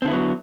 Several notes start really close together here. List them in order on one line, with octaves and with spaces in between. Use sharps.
C4 D3 E4 B3 F#3